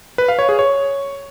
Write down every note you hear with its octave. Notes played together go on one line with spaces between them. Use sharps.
B4
F5
C#5
G#4
C#5